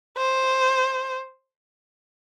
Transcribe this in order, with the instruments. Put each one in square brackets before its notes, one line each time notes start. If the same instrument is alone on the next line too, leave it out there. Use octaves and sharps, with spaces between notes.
[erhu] C5